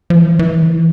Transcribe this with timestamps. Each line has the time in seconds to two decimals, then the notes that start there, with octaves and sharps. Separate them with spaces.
0.10 F3
0.16 E3
0.39 E3